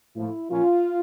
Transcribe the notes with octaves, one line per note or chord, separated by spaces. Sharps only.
A2 F3 A3 E4
A#2 F3 A#3 C#4 F4